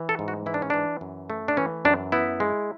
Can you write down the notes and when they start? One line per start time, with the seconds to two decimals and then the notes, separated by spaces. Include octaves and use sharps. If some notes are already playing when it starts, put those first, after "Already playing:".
Already playing: E3
0.09 A4
0.19 G#2
0.28 F#4
0.46 E3 E4
0.54 D4
0.62 C#4
0.70 E3 D4
1.01 F#2
1.30 A3
1.48 D4
1.57 E3 C#4
1.85 F#2 D4
2.12 B3 E4
2.40 G#3